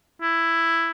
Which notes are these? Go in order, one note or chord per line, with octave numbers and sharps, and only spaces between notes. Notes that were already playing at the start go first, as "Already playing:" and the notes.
E4